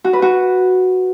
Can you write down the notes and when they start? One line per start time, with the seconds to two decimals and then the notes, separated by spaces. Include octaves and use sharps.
0.04 F#4
0.13 B4
0.22 F#4